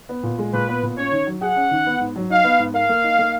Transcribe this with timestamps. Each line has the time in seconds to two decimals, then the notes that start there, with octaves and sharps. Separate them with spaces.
0.09 B3
0.23 A#2
0.39 G#3
0.53 A#2 B4
0.68 B3
0.83 A#2
0.97 C#4 C#5
1.11 D#3
1.27 F#3
1.41 G#4 F#5
1.56 C#4
1.71 D#3
1.86 B3
2.00 G#2
2.16 F#3
2.30 D#4 F5
2.44 B3
2.59 G#2
2.74 A#4 F5
2.89 A#3
3.03 D#4
3.19 A#3